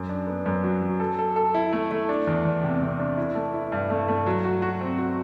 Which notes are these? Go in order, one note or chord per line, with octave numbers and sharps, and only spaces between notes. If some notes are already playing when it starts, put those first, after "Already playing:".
Already playing: F#2
D4
B3
F#2
F#3
F#3
A4
A4
A4
E4
A3
A3
D4
E2
E2
C3
C3
D4
E4
A3
E4
G2
A3
A3
F#3
F#4
F#4
C4
F#4